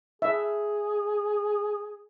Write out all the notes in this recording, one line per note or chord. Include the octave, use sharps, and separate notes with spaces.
G#4 E5